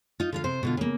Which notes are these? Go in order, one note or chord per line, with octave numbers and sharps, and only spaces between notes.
D#4 F4
D3 F4 F5
C3 C5
B2 D3 F4
C#3 A#3